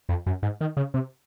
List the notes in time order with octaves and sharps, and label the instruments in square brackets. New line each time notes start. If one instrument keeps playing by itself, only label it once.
[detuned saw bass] F2
F#2
G#2
D#3
C#3
C3